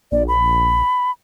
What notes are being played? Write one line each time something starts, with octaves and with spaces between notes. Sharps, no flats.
A#1 D5
B5